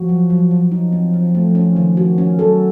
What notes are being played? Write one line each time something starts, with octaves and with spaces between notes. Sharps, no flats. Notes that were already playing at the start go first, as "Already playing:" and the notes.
Already playing: F3 F#4
F#3
F#3
F#3
F3 D#4
C4
C4
A3
C#4
D#3
F#4
C#4
F#3 A4